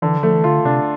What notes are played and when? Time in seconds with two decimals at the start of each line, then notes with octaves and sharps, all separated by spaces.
0.02 D3 E3
0.23 F3 A3
0.35 E3
0.44 D3 F4
0.65 C3 D4